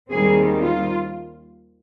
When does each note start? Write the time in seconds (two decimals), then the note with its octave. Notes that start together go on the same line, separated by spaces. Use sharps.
0.10 D#2 D#3 G3 C4 G#4
0.60 F4